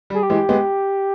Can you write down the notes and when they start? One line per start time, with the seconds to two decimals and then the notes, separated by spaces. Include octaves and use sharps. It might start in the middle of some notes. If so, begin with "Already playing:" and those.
0.10 G3
0.14 G#4
0.23 G4
0.30 E3 G#3
0.49 G#3 B3